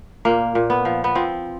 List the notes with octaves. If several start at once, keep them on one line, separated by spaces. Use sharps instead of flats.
A#2 A#3
A#2
B3
F3
B3
F3 C4